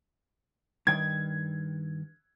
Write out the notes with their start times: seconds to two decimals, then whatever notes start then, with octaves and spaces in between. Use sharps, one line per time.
0.87 G2 D#3 G5 G#6